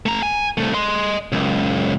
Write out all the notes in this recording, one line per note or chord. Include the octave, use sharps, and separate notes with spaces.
A3 A#5
G#5
C2 A3
D#5 C6
C#2 F#2